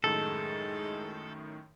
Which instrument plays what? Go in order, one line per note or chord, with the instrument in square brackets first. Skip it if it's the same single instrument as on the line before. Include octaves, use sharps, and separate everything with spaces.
[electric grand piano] F#2 A2 D#3 [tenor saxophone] G#3 [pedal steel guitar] A4